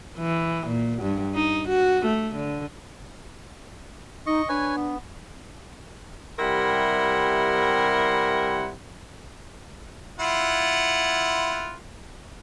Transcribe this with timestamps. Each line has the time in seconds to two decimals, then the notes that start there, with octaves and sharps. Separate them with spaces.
0.18 E3
0.67 A#2
1.02 G2
1.35 D#4
1.68 F#4
2.05 A3
2.35 D3
4.26 D#4 D#5 C#6
4.49 D4 B4 C#5 G#5
4.76 B3
6.39 C3 G3 E4 A#4 F#5 C6
10.20 E4 F4 F#5